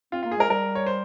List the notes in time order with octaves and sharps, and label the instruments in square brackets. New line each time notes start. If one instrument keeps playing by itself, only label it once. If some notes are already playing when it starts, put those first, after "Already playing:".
[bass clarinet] C4 [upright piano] F4
[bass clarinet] A#3 [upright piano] F4
[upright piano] G#4
[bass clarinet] G#3 [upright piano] A#4
[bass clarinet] G3 [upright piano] A#4
[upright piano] C#5
C5